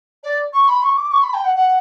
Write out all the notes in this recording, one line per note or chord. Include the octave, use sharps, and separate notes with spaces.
D5
C#6
B5
C#6
D6
C#6
B5
G5
F#5
F#5